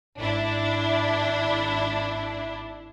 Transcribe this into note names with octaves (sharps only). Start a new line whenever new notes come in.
G#1 D4 E4